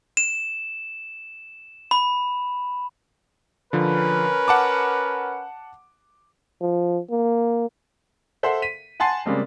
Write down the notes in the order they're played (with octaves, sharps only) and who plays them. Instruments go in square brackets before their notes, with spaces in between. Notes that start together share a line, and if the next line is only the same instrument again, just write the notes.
[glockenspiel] E7
B5
[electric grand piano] D3 F3 [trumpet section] C#4 A#4 B4
[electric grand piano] F#5 A5 D6
[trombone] F3
A#3
[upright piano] A4 C5 E5 F#5 C6
B6 D#7
F#5 G#5 A5 C6 A6 C7
C#3 G3 G#3 A#3 C4